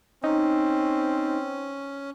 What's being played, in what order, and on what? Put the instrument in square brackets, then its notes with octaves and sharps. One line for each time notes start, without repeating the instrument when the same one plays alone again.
[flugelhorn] C4 [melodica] C#4 [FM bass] D#4